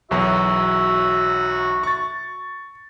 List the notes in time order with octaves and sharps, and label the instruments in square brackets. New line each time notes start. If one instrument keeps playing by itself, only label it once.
[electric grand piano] B1 E2 F#3 [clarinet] F#4 [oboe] E5
[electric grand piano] C#6 A6